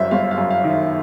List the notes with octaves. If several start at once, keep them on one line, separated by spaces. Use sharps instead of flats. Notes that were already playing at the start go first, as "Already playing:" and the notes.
Already playing: G1 F#2 C5 E5
G1 F5
F5
F#2
F5
D#3
E5